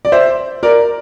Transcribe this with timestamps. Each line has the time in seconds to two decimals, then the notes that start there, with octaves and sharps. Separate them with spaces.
0.05 D5
0.12 C5 E5
0.63 A#4 D5